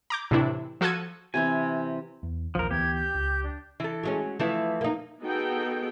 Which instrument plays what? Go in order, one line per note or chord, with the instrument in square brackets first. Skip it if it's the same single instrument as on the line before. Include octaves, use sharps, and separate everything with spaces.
[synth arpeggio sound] A#5 D6 G6
A2 C3 E3 D4 E4
F3 F#4 A4 F#6 G#6 D#7
[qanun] C3 E3 C4 [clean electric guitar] G#5
[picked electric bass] E2
[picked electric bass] A#1 D#2 [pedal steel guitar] F3 A#4
[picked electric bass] D2 E3 B3 [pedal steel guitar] G4 [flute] G#6
[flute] G6
[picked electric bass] C#2
[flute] D4
[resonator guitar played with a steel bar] E3 A4
[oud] F#3 G#3 C#4
[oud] E3 [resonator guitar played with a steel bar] F3 A3 E4
[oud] A#3 D#4
[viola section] B3 D#4 F#4 G#4 A4 G5